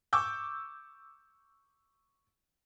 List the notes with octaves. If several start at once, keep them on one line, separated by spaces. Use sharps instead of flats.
C#6 D6 E6 G6